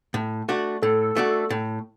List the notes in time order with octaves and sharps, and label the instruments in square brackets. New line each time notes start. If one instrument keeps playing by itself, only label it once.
[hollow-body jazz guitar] A2
A3 D4 F#4
[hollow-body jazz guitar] A2 [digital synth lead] A4
[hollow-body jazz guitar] A3 D4 F#4
A2